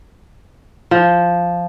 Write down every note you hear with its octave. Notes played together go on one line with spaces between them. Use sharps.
F3